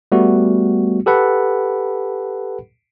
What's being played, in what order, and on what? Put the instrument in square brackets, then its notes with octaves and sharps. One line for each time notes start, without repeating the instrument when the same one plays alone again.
[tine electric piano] G3 A3 B3 F#4
G4 A4 B4 F#5 B5